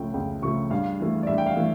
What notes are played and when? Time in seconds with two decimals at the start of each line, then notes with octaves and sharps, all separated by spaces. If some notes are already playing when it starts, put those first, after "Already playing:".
Already playing: C#2 C#3 F3 A3 G5
0.14 C#2 G5
0.42 C#3 F3 A3 C#6
0.70 G2 F5
1.00 E3 A3
1.23 D5
1.27 G2 E5
1.38 G5
1.46 F5
1.56 E3 A3